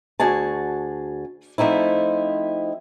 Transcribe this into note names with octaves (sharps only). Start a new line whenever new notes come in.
D2 F#4 G#4 A5
F3 A3 C4 D#4 E4